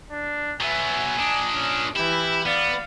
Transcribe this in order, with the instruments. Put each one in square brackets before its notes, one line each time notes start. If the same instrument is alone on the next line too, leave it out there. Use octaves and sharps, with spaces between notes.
[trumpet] D4
[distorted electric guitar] F#3 B3 [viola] E5 [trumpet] G#5
[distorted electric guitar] A#2 D4 [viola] D#5
[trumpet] C#4
[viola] E3 [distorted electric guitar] E4 [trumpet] G4
[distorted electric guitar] B3 [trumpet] D5 [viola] F5